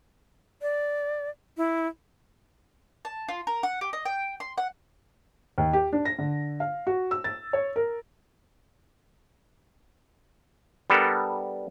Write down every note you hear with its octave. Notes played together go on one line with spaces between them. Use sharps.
D5
E4
A5
F4
A#4
F#5
G4
D#5
G5
C6
F#5
D#2
G4
D4
A#6
D3
F5
F#4
E6
A6
C#5
A#4
G3 B3 D4 A4 A#4